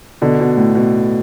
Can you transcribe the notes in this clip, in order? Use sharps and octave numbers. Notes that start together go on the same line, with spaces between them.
B2 D3
B2
A2
B2